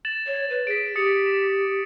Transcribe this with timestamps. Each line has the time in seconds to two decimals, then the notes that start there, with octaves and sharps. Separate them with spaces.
0.05 A6 E7 F#7
0.27 C#5
0.50 B4
0.67 G#4 B6 D7
0.96 G4 D#6 A6 C#7
1.26 E7